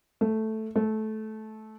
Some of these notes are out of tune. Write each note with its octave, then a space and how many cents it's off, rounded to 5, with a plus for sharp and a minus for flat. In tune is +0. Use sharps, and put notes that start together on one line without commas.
A3 +0
A3 -15